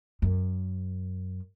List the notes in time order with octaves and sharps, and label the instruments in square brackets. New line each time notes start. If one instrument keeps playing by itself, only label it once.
[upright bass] F#2